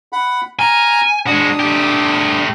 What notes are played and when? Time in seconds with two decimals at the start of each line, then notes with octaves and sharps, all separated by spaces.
0.13 F#5 B5
0.59 G#5 A#5 F6
1.27 G#3 D4 F#4 D#6
1.60 A3 G4